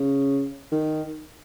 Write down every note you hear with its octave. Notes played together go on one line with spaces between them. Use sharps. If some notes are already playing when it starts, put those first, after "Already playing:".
Already playing: C#3
D#3